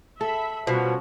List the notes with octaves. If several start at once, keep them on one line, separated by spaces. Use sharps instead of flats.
A4 E5 B5
B2 F3 G3 C#4 F#4